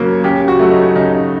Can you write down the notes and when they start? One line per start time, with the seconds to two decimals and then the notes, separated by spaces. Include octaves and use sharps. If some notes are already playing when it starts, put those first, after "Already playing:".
Already playing: C#3 F#3 A#3
0.24 C#3 G4
0.48 F#4
0.59 F#3 A3
0.71 D#4
0.96 C#3 D#4